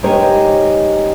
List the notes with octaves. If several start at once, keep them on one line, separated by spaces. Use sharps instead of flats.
G#3 D#4 G4 A#4 C5 C#5